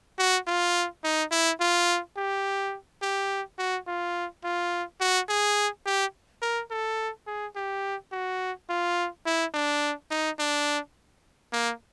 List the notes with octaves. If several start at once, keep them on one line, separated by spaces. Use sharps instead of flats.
F#4
F4
D#4
E4
F4
G4
G4
F#4
F4
F4
F#4
G#4
G4
A#4
A4
G#4
G4
F#4
F4
E4
D4
D#4
D4
A#3